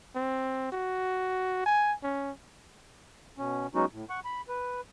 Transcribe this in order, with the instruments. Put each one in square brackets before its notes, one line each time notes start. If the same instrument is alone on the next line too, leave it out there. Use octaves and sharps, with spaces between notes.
[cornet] C4
F#4
G#5
C#4
[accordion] B2 C#4
F#3 G#3 B3 C#4 D#4 F#4
A2
F#5 C#6
B5
B4